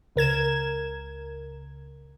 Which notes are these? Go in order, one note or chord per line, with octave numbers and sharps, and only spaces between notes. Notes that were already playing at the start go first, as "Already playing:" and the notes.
C#2 A#4 G#6 E7